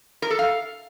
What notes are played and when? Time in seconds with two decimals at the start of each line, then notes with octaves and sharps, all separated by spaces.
0.22 A#4
0.31 A4
0.39 F5